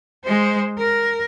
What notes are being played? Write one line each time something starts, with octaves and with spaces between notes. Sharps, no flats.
G#3 C5
A#4